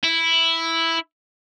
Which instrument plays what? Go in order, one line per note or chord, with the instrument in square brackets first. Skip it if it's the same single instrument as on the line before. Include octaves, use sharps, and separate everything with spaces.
[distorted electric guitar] E4